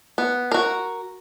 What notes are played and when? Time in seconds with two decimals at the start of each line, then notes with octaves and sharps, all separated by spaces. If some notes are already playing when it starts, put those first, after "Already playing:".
0.18 B3
0.52 F#4 A#4